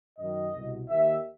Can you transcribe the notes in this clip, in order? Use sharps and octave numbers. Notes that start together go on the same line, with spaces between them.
F#2 D#3 D#5
C2 B2
D#2 D#3 E5